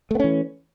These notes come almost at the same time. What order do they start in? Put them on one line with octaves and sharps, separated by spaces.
A3 B3 C#4 E3